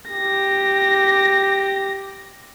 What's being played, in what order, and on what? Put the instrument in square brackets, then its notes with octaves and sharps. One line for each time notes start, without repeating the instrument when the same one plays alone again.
[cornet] G4 [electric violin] A#6